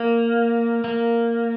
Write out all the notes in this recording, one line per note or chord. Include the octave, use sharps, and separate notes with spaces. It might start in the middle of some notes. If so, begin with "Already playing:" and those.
Already playing: A#3
A#3